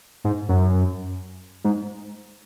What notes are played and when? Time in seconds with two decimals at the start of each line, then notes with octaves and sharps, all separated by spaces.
0.24 G#2
0.49 F#2
1.65 G#2